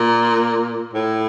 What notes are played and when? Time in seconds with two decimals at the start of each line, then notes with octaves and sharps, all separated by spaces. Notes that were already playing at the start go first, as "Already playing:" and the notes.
Already playing: A#2
0.93 A2